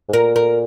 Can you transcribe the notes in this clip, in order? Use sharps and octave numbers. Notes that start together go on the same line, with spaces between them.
G#2
A#2 A#4
A#4